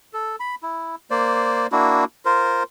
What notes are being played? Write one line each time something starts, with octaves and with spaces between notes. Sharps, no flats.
A4
B5
E4
A#3 C5 D5
A#3 D4 E4 F#4
F4 A#4 C5